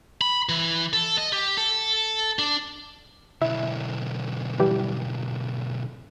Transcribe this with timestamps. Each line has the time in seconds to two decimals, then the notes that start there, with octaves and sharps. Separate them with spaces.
0.21 B5
0.49 E3
0.93 A4
1.17 D#5
1.33 G4
1.57 A4
2.39 D4
3.41 B1 D3 E4
4.59 E3 G3